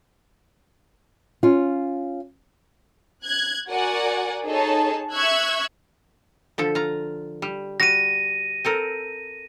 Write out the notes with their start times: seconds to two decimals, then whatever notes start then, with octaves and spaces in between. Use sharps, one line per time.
1.43 C#4 F4
3.24 F#6 G#6
3.69 F#4 A#4 D5 F#5 G#5
4.45 D#4 G#4 A4 C#5 A5
5.13 E5 C#6 E6 F#6 G#6
6.58 D3 F3 A4
6.75 F4 A#5
7.42 G3
7.80 G3 F#4 A#6 D#7
8.65 C4 A4 A#4